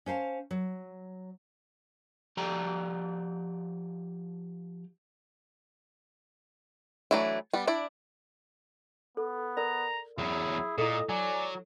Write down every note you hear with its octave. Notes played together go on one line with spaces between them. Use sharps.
C#4 C5 F5 A5
F#3
F3 G4 D5 G5 A#5
E3 F#3 A3 D4 E4
G3 B3
D4 E4 D5
B3 A4
A#4 D5 A#5
E2 F#3 E4 G#4
A#2 E4 A4 D#5
F#3 D5 G#5